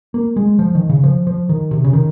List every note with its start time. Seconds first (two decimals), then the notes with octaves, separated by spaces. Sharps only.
0.14 A#3
0.36 G#3
0.59 F3
0.75 D#3
0.90 C#3
1.04 F3
1.27 F3
1.49 D#3
1.71 C3
1.84 C#3
1.93 D#3